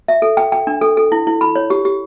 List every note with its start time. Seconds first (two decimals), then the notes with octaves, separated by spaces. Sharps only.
0.08 E5
0.22 A4
0.37 G5
0.52 G5
0.67 D4
0.81 A4
0.97 A4
1.12 E4
1.27 E4
1.41 B5
1.56 C#5
1.70 G4
1.85 G4